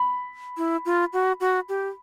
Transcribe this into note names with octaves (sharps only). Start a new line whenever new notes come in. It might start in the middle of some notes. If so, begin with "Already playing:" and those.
Already playing: B5
E4
F4
F#4
F#4
G4